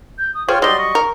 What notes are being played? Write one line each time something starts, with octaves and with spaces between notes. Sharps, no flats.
G6
D#6
F4 G#4 C5 C#5 G5 F6
F#3 G3 D5 D#5 C6 G7
D#5 C#6
A#4